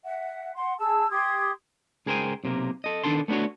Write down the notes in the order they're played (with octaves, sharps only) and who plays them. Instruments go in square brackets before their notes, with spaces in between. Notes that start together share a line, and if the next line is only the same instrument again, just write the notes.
[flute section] E5 F#5
F#5 C6
G#4 A5 E6
G4 C6 D#6 G#6
[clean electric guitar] C#2 G#4 A#4 C5 G5 G#5
B1 C3 A#3 A#4
A4 D#5
D#3 B3 D4 A4 A5 C6
A3 B3 D4 F#4 C#5